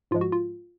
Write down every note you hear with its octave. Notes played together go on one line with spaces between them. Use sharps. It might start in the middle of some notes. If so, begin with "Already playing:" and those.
G#2 F3 G#3 F4
F#4
F4